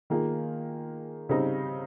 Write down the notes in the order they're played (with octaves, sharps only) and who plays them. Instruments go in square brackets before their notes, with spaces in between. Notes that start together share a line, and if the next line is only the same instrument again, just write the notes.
[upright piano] D#3 A#3 F4 G#4
C#3 G3 C4 D#4